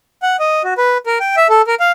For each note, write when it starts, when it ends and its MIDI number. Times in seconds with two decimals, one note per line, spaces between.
0.22 0.37 78
0.39 0.63 75
0.64 0.74 66
0.78 0.98 71
1.06 1.18 70
1.20 1.36 79
1.37 1.47 76
1.49 1.62 69
1.67 1.75 70
1.80 1.92 77